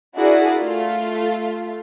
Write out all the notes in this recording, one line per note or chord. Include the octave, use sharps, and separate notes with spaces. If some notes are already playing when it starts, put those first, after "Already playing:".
D4 E4 F#4 G#4 A#4 D5
A3 F4